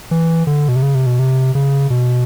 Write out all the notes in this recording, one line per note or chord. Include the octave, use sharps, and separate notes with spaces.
E3
D3
B2
C3
C#3
C3
B2
C3
C#3
B2